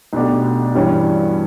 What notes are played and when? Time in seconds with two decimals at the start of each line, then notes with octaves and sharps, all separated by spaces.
0.13 B1 B2 A3 D4 G4
0.75 G2 E3 G3 C#4